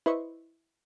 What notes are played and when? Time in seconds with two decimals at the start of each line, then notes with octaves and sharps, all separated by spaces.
0.06 E4 B4 C5 D#5 C#6